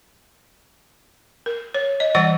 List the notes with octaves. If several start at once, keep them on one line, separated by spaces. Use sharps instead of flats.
A#4
C#5
D#5
E3 G3 D5 F#5